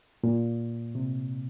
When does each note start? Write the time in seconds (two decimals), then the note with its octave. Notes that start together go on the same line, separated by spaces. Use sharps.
0.24 A#2
0.95 C3